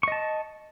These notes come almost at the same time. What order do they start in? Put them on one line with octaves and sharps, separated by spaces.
C#6 D#5 A5